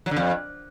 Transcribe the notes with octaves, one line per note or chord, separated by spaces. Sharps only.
F#3
D3
F2